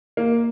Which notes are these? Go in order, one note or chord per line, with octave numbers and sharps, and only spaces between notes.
A#3